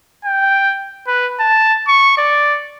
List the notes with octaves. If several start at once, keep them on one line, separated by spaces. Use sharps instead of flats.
G5
B4
A5
C#6
D5